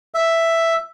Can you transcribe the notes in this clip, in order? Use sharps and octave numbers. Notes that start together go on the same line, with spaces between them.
E5